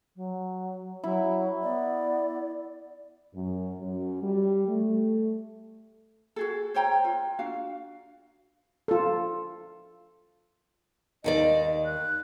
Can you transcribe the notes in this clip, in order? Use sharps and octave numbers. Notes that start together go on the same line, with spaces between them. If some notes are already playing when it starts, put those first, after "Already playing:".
F#3
F#3 E4
B3 D5
F#2
F#2
G3
A3
F#4 G#4 A4
C5 C#5 G5 A#5
F4
D4 F#4 F5
F4 A4
D#2 D#3 D5 D#5
F#6